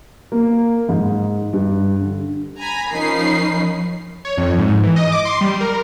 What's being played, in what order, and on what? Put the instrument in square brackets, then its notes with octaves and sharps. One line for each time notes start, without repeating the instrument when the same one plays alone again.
[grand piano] A#3
G#2
G2
D3
[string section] G#5 A#5 B5
F3 C#4 D#4 A#4 B5 C7
[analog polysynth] C#5
F2
G#2
E3
D#5
D6
C6
G3
A#4